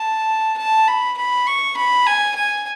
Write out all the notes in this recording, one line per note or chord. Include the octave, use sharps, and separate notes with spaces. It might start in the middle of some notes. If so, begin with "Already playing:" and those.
Already playing: A5
A5
B5
B5
C#6
B5
G#5
G#5